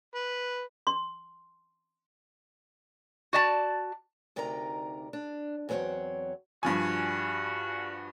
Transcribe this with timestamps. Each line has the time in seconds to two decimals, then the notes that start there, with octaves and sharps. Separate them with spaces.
0.15 B4
0.87 C6
3.33 F#4 D5 A5
4.36 D2 C3 D#4 A#4 D5 A#5
5.13 D4
5.69 E2 F#3 C4 D#4 C#5 F#5
6.63 G2 F3 G3 F#4 G#5